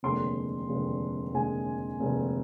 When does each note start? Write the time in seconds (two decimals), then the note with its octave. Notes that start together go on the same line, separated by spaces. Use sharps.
0.03 F1 D#2 D3 G#3 C6
0.69 F1 D#2 D3 G#3
1.34 F1 D#2 D3 G#3 G#5
2.00 F1 D#2 D3 G#3